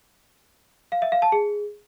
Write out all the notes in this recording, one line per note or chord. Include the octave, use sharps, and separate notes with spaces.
F5
E5
F5
A5
G#4